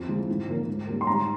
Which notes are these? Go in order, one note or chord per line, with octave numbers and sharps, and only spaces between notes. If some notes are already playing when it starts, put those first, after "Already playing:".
Already playing: F2
E3 G#3
G#2
F3 A#3
G#2
G3 A#3
C6
G#2 A#5